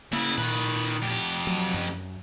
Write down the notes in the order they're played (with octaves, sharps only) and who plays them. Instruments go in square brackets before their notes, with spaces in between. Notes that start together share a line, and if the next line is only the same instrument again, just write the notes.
[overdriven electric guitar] C#3 E4 [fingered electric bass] A#3
[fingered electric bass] A#2 [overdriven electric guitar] D#3 B4
[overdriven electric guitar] F2 G4
[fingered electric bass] F#3
F#2